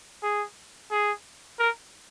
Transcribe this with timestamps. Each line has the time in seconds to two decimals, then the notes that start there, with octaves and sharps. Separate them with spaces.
0.23 G#4
0.91 G#4
1.59 A#4